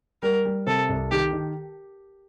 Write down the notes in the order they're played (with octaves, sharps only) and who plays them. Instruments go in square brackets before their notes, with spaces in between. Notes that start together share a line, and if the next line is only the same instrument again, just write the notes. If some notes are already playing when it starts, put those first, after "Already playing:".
[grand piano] G3 [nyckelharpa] A#4
[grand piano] G3
[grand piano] C3 [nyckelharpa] A4
[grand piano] C2
[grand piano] D#3 [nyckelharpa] G4
[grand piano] D#3